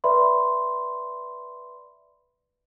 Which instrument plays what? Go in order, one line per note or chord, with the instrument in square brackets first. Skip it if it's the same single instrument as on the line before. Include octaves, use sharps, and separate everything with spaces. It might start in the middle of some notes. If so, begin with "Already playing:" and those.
[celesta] B4 D5 E5 B5 C6